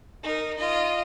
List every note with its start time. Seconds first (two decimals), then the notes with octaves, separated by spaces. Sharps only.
0.23 D#4 A#4
0.57 F4 D#5